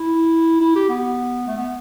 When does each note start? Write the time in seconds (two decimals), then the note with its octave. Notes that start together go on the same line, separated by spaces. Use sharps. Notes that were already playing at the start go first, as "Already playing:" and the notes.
Already playing: E4
0.61 E4
0.75 G4
0.89 B3
1.47 A3
1.57 B3